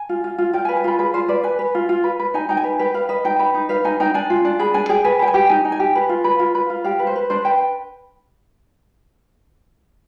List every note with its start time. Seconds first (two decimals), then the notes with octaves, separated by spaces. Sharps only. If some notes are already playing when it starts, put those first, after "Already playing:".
Already playing: G#5
0.09 F4
0.24 F4
0.38 F4
0.53 F4 G5
0.65 G#5
0.69 B4
0.77 G#5
0.84 F4 B4
0.99 G#4 B4
1.14 F4 C5
1.28 B4 D5
1.44 B4 G#5
1.59 B4
1.75 F4
1.89 F4
2.04 B4
2.19 B4
2.34 D#4 G#5
2.49 D#4 G5
2.57 G#5
2.64 B4
2.79 B4 G5
2.94 B4 F5
3.09 B4 D#5
3.25 D#4 G5
3.39 B4
3.54 D#4
3.69 B4 F5
3.85 D#4 G#5
4.00 D#4 G5
4.14 D4 G#5
4.30 F4
4.45 D4
4.59 G#4 B5
4.74 D4 G#5
4.89 G#4 G5
5.04 B4 G#5
5.19 B4 G5
5.28 G#5
5.34 G4
5.49 D#4 G#5
5.65 D#4
5.72 G#5
5.80 G4
5.95 B4
6.09 F4
6.24 B4
6.39 F4
6.55 B4
6.70 F4
6.84 G4 F5
6.99 B4
7.07 C5
7.16 B4
7.30 D4 C5
7.45 B4 G5